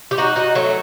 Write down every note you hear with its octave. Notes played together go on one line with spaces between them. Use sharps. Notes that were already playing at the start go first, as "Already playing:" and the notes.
G4
D#4 F#4
D#4 F#4
F#3 A3